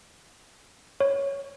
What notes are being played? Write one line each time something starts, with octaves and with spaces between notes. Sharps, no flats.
C#5